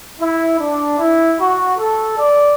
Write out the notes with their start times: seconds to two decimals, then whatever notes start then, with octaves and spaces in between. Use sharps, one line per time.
0.20 E4
0.60 D4
0.99 E4
1.39 F#4
1.78 A4
2.17 D5